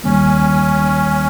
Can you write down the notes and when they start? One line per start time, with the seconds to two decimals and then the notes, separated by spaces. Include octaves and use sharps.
0.04 D#2 D#3 G3 A#3 C#4